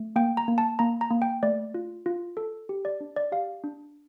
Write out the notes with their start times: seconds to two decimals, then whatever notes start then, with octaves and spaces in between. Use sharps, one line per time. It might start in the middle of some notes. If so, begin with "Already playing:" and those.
Already playing: A3
0.16 A#3 G5
0.37 A#5
0.48 A#3
0.58 A5
0.79 A#3 A#5
1.01 A#5
1.11 A#3
1.22 G5
1.43 A3 D5
1.74 F4
2.06 F4
2.37 A4
2.69 G4
2.85 D5
3.01 D4
3.16 D5
3.32 G4 F5
3.64 D4